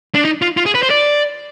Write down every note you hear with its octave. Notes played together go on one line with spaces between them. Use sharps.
D4
D#4
F4
F4
G#4
B4
C5
D5